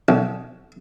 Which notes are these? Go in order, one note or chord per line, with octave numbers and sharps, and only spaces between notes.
B1